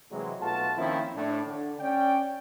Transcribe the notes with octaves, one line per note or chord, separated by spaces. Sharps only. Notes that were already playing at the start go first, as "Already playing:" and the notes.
C3 E3 F#3 G#3
B1 A3 F4 F#4 B4 A5
D#3 F3 A#3 C4 C#4 E4
A2 D4
D3
C#4 D5 G5